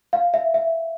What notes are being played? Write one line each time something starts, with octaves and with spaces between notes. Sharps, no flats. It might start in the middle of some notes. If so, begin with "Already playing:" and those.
F5
E5
E5